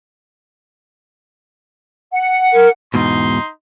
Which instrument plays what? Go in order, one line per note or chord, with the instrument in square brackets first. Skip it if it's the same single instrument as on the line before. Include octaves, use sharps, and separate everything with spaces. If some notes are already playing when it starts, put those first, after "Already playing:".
[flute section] F#5
[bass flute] A#4
[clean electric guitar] E2 G#2 B2 [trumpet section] D#4 C6